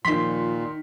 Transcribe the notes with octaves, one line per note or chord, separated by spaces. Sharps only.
A#2 D#3 F3 C6 B6